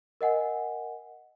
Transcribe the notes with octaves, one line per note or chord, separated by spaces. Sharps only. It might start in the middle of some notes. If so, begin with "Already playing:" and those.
A#4 D#5 F#5 G#5